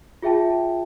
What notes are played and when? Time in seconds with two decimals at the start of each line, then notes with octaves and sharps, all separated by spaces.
0.22 F4 G#4 E5 G5 A5